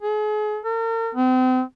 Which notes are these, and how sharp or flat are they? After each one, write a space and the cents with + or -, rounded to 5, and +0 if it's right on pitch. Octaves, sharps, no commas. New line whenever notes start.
G#4 +35
A#4 -40
C4 -35